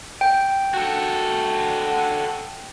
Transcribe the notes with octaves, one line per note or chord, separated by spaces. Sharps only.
G5
F#4 A4